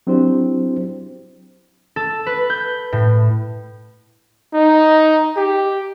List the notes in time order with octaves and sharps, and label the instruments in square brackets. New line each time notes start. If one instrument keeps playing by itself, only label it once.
[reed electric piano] F#3 C4 D4 E4 G4 C5
[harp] A4
B4
G6
A2
[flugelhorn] D#4
G4